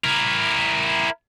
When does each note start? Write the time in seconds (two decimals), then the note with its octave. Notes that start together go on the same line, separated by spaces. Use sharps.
0.04 E4 A#4